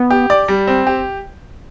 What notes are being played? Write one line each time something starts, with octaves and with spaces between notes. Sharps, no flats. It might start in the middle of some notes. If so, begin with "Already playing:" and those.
Already playing: B3
G4
D5
G3
C4
G4